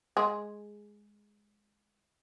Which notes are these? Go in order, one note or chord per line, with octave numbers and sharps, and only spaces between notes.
G#3 G#4